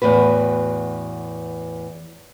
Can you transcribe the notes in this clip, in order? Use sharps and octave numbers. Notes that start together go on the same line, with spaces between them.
E2 A2 F#4 B4